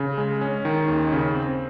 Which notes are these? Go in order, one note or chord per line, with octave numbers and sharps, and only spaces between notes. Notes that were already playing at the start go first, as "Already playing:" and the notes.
Already playing: C#3
G#3
C#4
D#3
D#2
C#3
C4